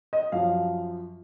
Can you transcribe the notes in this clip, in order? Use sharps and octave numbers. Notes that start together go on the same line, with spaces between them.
D#5
F#2 F3 F5